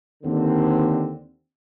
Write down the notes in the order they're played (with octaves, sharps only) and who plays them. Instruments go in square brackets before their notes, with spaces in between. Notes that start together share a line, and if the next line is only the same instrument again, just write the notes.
[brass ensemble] D#2 D3 C4